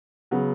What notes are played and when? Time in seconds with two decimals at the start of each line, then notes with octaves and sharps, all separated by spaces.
0.31 C#3 F#3 B3